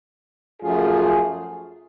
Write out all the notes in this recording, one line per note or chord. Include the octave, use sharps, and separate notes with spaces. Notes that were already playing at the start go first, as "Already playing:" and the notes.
F#2 F3 A3 F4 G#4